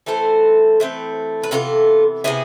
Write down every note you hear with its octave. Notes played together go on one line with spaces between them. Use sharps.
E3 A3 C4 A4 C5
E3 A3 C4
B4
C3 E3 B3 F4 A4
C3 E3 B3 E4 G#4